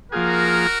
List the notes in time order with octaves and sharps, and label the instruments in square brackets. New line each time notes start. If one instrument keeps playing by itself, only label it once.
[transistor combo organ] F3 A#3 F4 G#4 [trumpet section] F#4 A#4